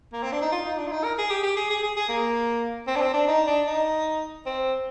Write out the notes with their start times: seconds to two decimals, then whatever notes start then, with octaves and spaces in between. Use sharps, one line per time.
0.13 A#3
0.23 C4
0.32 D4
0.42 D#4
0.52 F4
0.66 D#4
0.78 D4
0.87 F4
0.92 D#4
1.04 A#4
1.18 G#4
1.30 G4
1.44 G4
1.57 G#4
1.70 G#4
1.83 G#4
1.97 G#4
2.09 A#3
2.88 C4
2.96 D4
3.01 C4
3.14 D4
3.28 D#4
3.47 D4
3.67 D#4
4.46 C4